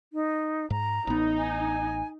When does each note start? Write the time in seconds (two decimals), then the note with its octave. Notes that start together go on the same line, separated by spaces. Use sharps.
0.13 D#4
0.70 G#2 A#5
1.07 A1 B3 D#4
1.38 G#5